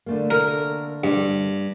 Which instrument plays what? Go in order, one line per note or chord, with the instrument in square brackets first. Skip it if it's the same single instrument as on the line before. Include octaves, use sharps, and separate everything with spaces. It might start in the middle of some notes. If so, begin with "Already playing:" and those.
[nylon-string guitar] D3 A3 A#3
[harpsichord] A#4
G2